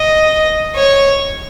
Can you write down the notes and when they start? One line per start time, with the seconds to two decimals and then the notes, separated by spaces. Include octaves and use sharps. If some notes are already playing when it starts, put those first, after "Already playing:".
Already playing: D#5
0.75 C#5